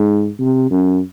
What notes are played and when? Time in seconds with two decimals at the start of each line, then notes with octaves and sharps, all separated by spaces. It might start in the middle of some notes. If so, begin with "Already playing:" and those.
Already playing: G#2
0.39 C3
0.71 F#2